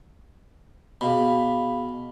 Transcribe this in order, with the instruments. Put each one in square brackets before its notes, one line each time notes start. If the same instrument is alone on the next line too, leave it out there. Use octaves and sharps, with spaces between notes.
[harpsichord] B2 [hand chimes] G#4 F5 B5